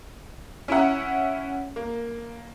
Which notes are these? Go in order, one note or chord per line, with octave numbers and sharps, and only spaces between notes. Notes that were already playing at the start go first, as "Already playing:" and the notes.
C#4 E4 E5 F#5
A#3